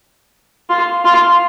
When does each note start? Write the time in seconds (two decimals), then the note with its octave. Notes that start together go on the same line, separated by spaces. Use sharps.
0.70 F4
1.05 F4